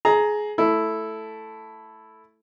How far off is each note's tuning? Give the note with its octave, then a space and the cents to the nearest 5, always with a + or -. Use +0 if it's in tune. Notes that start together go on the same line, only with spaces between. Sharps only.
G#4 +20 A#5 +0
A3 +0 E4 +0 A4 +0